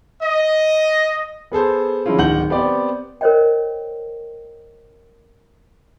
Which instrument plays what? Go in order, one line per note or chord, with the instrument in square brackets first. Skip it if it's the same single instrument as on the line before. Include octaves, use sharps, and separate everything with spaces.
[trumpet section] D#5
[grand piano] B3 G#4 A4 C5
D3 F3 G#3 C#4 E4 F4
D1 D#3 F#5 G6 F#7
B3 C4 G4 D5
[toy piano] A#4 C5 C#5 D#5 G5